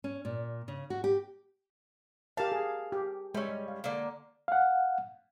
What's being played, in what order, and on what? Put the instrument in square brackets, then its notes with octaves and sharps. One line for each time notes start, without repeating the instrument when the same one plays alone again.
[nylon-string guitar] C#4
A#2
C#3
F#4
G4
[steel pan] G4 A#4 A5 [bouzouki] F5
[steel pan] G#4
G4
[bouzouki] G3 C#4 [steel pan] G#3 E5
[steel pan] F5
[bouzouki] D3 A#3
[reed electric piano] F5 F#5